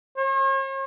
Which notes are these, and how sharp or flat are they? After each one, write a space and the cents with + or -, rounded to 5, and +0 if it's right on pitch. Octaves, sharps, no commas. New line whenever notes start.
C#5 -45